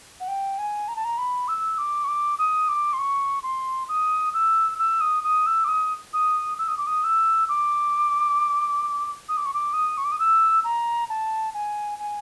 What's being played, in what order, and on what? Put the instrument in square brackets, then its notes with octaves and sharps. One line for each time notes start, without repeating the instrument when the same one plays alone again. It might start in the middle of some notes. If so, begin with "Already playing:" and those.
[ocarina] F#5
G5
G#5
A#5
A5
A#5
B5
E6
D6
C#6
D6
D#6
D6
C6
C#6
C6
D#6
E6
E6
D#6
D#6
E6
D6
D#6
D#6
E6
D#6
D6
D#6
E6
D6
D#6
D6
C#6
D6
D#6
C#6
D6
D#6
E6
A#5
A5
G#5
G#5